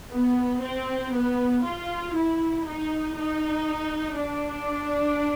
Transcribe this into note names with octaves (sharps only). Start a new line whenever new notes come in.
B3
C4
B3
F4
E4
D#4
D#4
D4